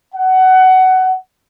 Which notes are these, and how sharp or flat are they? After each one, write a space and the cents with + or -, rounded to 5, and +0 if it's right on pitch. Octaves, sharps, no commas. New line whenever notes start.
F#5 +20